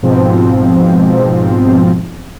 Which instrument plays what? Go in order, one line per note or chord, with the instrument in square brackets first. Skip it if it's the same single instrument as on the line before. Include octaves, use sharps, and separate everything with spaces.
[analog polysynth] G#2 B2 F3 C4